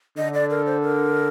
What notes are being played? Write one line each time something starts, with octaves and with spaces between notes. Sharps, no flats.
D3 D#5
D5
A#4
C5
A#4